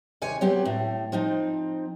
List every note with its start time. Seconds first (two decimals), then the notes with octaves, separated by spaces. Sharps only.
0.22 D#2 C3 C#5 G#5
0.41 F#3 B3 C4 G4
0.65 A2
1.12 F3 C4 D#4